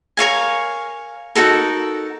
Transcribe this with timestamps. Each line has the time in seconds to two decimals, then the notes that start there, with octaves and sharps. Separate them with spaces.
0.17 A#4 C#5 F5 G#5
1.35 D#4 F#4 A4 A#4